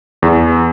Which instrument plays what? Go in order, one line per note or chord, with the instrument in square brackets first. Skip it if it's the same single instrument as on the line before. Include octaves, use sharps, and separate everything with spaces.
[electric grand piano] E2